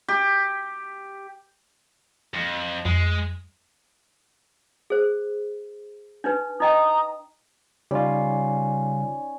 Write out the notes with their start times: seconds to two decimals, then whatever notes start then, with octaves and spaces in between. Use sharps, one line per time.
0.08 G4
2.34 F2
2.85 F2 G#3
4.90 G#4 C5
6.24 D4 D#4 B4
6.60 D#4 D#5 G5 A#5 D#6
7.91 C#3 G3 C#4 D#4 F4 D5